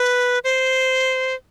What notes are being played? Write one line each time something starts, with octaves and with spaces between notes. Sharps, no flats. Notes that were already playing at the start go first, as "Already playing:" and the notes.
Already playing: B4
C5